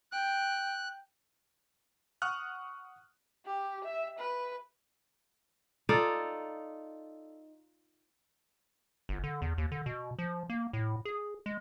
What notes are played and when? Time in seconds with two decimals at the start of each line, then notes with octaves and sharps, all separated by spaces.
0.12 G5 F#6
2.22 F#5 C#6 D#6 F6 F#6
3.46 G4
3.85 E5
4.20 B4
5.89 D#4 F4 A4 D5
9.09 G1
9.24 D3
9.42 E2
9.58 D#2
9.72 D3
9.86 B2
10.19 F3
10.50 A#3
10.73 A2
11.05 G#4
11.46 G#3